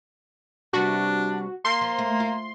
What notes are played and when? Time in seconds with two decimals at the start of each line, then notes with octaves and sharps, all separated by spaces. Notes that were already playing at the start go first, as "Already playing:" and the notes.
0.73 C3 G3 B3 D4 F#4
1.65 A#3 C6
1.81 F3
1.99 A3
2.20 F4